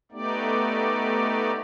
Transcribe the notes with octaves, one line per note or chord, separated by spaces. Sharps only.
A3 B3 D#4 G4 D5